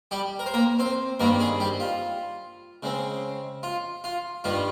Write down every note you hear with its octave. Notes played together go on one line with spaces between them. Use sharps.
G3 G4
A#4
C5
A#3 A#4
C4 C5
G2 D#3 G3 A#3 C4 A#4
G#3 G#4
G3 G4
F4
C#3 G#3 C4
F4
F4
G2 D#3 G3 F4